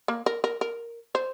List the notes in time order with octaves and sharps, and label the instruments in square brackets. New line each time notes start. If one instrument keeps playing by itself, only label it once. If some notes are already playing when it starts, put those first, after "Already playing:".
[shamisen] A#3
A#4
A#4
A#4
C5